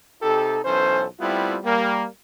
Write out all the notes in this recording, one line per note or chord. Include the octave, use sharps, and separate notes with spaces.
C3 D#4 G4 A4
B1 E3 C#4 A4 C5
G3 A3 B3 C4 E4 F4
G3 A#3